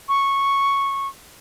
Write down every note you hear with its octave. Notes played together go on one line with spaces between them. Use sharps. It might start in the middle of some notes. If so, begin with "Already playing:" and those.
C#6